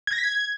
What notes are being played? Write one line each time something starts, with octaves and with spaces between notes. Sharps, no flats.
G#6
A#6
B6
G#6